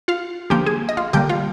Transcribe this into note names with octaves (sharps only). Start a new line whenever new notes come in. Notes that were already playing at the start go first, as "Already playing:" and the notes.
F4 F5
D3 F3 A#3 G4 G5
G#4 G#5
D#5
F4 F5
D3 G3 A#3 G4 G5
F4 F5